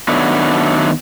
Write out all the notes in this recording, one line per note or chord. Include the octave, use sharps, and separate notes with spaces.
D#3 F#3 A3 B3 D4